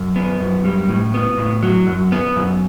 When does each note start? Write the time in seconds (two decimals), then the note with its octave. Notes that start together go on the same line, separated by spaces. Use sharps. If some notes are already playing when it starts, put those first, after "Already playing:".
Already playing: F#2
0.16 B3
0.40 F#2
0.65 G3
0.89 A2
1.14 B3
1.38 A2
1.63 F#3
1.87 F#2
2.12 B3
2.36 F#2